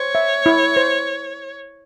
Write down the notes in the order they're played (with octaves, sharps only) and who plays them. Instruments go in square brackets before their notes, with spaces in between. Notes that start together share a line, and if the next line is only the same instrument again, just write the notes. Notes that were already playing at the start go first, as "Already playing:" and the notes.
Already playing: [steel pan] C5 [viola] C#5
[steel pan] E5
E4
C5